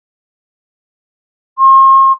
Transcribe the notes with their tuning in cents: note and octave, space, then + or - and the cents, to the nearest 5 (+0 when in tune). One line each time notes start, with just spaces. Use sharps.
C6 +45